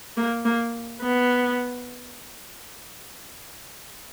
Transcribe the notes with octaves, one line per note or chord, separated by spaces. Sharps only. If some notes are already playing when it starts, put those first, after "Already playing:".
A#3
A#3
B3